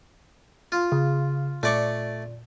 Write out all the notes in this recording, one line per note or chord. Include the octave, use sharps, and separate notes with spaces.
F4
C#3
A#2 A3 D5 C#6